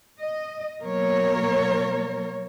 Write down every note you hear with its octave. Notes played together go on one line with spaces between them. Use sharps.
D#5
B2 F#3 A#3 A#4 C#5